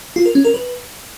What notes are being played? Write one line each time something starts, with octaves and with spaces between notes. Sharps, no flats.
F4
A#4
C#4
A#4
B4